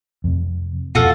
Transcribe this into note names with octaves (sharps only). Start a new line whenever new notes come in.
F2 C3
F2 B2 F4 F#4 A4